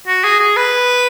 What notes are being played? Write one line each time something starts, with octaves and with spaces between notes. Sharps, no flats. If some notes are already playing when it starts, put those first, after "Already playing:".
F#4
G#4
G#4
B4